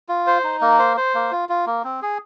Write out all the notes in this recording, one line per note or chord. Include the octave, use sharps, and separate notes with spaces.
F4
C5
D#4
A#3
C5
C5
A#3
F4
F4
A#3
C4
G#4